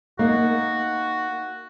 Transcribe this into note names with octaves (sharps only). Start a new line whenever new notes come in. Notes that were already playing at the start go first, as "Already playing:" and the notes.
A#3 D#4 F#4